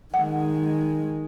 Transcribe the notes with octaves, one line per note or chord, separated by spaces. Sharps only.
D#3 G#3 F#5